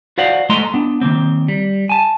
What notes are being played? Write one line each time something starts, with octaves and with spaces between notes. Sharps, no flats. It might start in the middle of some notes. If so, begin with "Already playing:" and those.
F#4 C5 D5 F5 F#5
G#3 A3 D#5 A#5 C6
B3 D4
D#3 F3 A#3 C4
G3
G#5 A5